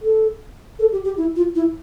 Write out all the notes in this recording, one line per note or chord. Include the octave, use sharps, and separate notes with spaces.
A4
A4
G4
G4
E4
F4
E4